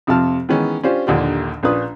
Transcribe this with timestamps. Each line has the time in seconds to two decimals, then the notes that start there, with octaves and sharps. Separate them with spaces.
0.07 F2 C3 F4 A5 F6
0.49 D#3 E3 G#3 B3 C#4
0.83 C#4 D4 F4 G4 C5
1.07 A#1 D#2 D3 F4 G4
1.63 A#1 C#4 D4 F4 B4 D#6